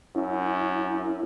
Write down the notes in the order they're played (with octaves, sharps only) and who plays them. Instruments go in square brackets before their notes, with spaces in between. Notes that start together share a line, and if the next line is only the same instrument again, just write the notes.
[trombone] F#2 [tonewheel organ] C#4 E4